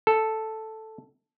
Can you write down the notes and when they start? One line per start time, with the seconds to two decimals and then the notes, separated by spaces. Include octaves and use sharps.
0.07 A4